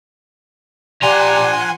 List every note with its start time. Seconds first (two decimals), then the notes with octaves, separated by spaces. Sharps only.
1.02 F3 G4 D5 F#5 G#5 A#5 C6